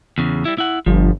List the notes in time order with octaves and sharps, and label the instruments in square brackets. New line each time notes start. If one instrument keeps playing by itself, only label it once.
[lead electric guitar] E2 C#3
G3 E4
E4 F#5
[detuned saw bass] G1 [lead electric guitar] F3